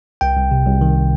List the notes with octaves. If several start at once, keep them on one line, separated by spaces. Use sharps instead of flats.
C2 G5
C2
C3
C2
D#3